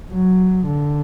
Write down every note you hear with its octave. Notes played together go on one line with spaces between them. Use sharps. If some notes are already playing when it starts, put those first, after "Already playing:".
F#3
D3